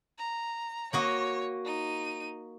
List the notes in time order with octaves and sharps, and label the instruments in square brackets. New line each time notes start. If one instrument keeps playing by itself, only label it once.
[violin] A#5
[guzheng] A#3 F#4 D#5 [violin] C#5
[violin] D#4 D#7